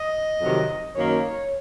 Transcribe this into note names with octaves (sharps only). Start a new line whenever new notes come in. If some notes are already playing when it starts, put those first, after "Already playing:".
Already playing: D#5
F2 C3 D#3 F#3
F#2 D#3 A#3 C#5